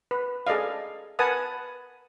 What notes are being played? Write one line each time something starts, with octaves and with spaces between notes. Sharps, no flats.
B4
G#4 A4 D5 D#5 F5
A#4 B4 F#5 G#5 A5 D#6